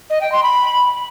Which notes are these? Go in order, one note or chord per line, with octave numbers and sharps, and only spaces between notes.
D#5
G5
C6
B5